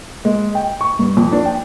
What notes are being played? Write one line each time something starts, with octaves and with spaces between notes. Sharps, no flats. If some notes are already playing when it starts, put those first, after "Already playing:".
G#3
G5
C#6
G2
F2
D4
G5